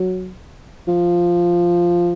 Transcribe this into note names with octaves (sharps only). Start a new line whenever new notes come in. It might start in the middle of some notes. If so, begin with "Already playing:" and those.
Already playing: F#3
F3